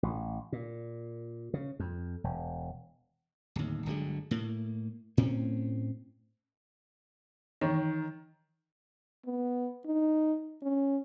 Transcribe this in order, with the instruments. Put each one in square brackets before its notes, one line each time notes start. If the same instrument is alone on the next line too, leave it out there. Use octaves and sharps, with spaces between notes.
[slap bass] A1
A#2
C#3
F2
E1
D1 D#2
G1 D3 F#3 G#3
A2 A#3
A2 C4 C#4
[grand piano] D#3 [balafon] E3 C#5
[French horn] B3
D#4
C#4